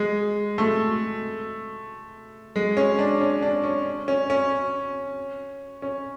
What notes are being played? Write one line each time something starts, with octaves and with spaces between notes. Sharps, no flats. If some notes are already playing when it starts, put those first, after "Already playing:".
Already playing: G#3
A3
G#3
C#4
D4
C#4
D4
C#4
C#4
C#4
C#4